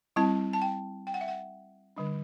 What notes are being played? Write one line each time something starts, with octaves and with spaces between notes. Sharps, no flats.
G3 C4 E4 A5
A5
G5
G5
F#5
E5
F#5
D3 G3 D4